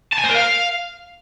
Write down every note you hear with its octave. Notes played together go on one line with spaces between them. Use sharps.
A5
G#5
C5
A#4
F5